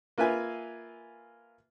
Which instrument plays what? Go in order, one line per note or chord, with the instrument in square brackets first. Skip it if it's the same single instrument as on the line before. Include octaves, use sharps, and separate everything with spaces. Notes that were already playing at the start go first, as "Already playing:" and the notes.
[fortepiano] A#3 F4 B4 E5 G#5